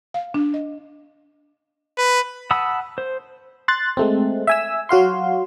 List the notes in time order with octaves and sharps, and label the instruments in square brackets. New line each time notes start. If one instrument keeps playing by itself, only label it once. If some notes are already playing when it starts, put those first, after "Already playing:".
[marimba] F5
D4
D#5
[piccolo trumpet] B4
[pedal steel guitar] F#5 A5 B5 D#6 E6
C5
[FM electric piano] C6 F#6 A6
G#3 A3 C4
E5 G#5 E6
F#3 F#4 F5 C6